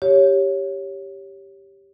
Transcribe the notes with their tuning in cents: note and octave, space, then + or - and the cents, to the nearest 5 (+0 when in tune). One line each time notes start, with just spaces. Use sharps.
G4 +0 C#5 +0